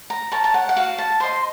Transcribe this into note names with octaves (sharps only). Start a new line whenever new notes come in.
A#5
A#4 C#5 A5
A5
F#5
F#5
F#4 F5
A5
C5 D#5 C6